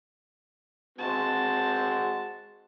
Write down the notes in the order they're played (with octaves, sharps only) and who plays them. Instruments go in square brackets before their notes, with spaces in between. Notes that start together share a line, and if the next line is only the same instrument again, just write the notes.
[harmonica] G#3 C4 F#4 [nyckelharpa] A5